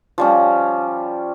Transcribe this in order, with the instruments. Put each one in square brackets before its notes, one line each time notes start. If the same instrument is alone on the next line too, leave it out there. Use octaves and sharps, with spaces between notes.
[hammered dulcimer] F3 G3 C#4